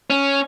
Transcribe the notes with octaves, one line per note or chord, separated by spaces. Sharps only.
C#4